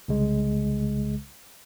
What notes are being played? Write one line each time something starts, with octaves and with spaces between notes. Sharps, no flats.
C2 C#3 G#3